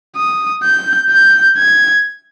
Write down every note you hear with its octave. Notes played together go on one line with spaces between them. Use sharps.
D#6
G6
G6
G#6